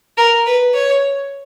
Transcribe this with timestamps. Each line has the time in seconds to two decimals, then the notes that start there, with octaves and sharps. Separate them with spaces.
0.18 A#4
0.47 B4
0.74 C#5